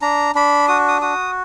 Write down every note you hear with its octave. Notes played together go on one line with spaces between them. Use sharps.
D4 A#5
D4 B5
F#4 D#6
D#6
F#4 D#6